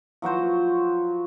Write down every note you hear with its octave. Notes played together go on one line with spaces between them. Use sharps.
F3 F#3 F#4 C5